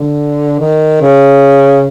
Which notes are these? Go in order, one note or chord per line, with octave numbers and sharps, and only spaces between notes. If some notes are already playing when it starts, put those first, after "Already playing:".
Already playing: D3
D#3
C#3